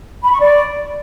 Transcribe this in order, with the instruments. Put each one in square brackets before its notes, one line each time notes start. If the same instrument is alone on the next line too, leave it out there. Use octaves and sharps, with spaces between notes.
[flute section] B5
C#6
D5